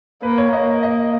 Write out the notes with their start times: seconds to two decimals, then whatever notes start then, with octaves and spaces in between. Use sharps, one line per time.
0.23 A#3 B4
0.38 C#5
0.52 A#3 D#5
0.83 D#5